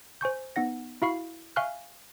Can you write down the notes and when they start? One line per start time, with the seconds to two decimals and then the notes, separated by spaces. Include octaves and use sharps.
0.21 C5 G#5 C#6 G6
0.56 B3 D#4 F#5 A#6
1.02 E4 F#4 F5 B5 C#6 C7
1.56 E5 F5 G#5 C#6 F6 F#6